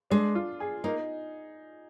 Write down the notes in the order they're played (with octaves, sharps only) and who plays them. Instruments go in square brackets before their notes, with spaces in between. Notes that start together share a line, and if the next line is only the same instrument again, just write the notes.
[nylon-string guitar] G#3 [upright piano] D4
[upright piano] F4
G#4
[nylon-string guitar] A#3 [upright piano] D#4